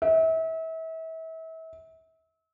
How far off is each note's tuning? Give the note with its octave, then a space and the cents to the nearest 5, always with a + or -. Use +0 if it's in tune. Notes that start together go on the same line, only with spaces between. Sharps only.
E5 -35